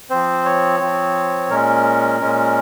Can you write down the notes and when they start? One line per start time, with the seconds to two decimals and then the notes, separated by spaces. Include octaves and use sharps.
0.10 F3 C4 C5
0.45 C#5
0.80 F3 C4
1.50 A#2 G#3 C#4 A#4
2.20 A#2 G#3 C#4